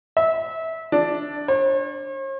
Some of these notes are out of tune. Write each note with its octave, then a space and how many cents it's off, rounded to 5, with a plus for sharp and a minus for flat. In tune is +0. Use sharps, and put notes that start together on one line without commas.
E5 -20
D4 +0
C#5 -45